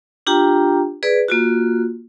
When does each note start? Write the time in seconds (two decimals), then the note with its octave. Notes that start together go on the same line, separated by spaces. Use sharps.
0.27 D4 F4 G4 G5 A#5
1.03 G#4 B4 D5
1.28 A#3 F4 F#4